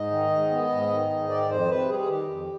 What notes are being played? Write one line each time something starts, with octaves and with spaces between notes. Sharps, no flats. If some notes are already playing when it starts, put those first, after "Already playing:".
Already playing: G#2 D#5
D#3
G#2
B3
G#2
D#3
G#2
D#3 D5
F2 C5
C3 B4
G3 G#4
G#4
D#3 G4
F2